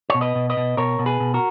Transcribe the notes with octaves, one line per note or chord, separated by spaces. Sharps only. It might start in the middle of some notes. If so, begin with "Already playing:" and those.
B2 C#5
B4 D#5
B2
B4 D#5
B2
B2 A#4 C#5
B2
G#4 B4
B2
F#4 A#4